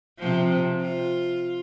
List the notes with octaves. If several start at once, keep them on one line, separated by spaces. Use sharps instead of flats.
C3 F3
F4